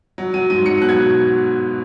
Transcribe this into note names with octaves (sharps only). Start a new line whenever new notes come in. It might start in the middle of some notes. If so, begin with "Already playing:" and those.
F#3
F#3 D#7
G#2 D#7
F#3 C#7
B2 F#6
G#6